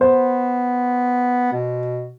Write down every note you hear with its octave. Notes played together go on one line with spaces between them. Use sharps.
B3 C5
B2